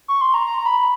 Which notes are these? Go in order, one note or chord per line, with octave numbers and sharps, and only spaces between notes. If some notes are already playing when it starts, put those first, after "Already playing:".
C#6
C6
A#5
A#5
A#5
B5